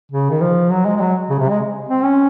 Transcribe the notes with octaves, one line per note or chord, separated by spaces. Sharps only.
C#3
D#3
F3
F#3
G#3
G#3
F#3
C#3
C3
G#3
C4
C#4